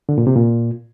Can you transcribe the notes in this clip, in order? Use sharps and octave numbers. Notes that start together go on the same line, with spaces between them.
D3
A#2
C3
A#2